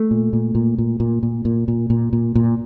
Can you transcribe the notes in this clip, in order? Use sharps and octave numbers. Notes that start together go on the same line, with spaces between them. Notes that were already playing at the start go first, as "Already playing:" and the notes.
Already playing: A3
A#2
A#2
A#2
A#2
A#2
A#2
A#2
A#2
A#2
A#2
A#2